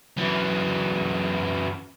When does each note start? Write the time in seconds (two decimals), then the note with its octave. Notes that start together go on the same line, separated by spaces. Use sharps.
0.18 F#2 E3